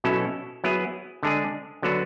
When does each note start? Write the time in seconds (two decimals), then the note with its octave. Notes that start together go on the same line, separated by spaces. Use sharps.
0.04 B2 F#3 C#4 E4 A4
0.64 F#3 B3 E4 G#4
1.23 D3 G#3 D4 G#4
1.82 D3 F#3 B3 D4 F#4